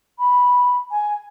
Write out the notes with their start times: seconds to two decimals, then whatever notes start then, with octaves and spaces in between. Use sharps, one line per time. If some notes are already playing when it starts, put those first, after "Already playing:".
0.18 B5
0.91 G#5